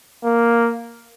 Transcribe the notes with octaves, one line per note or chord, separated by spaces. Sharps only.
A#3